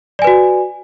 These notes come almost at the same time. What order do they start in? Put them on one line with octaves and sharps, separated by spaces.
D5 G#5 B4 F#4